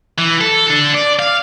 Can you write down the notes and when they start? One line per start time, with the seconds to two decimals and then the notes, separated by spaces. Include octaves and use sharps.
0.18 E3
0.41 A4
0.67 D4 A4
0.94 D5
1.19 F5